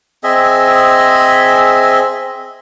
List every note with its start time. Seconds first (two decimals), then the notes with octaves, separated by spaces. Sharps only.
0.24 C4 G#4 D#5 E5